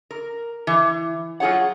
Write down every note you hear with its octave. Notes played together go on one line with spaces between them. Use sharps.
A#4
E3
F#3 F4 G#4 C#5 F#5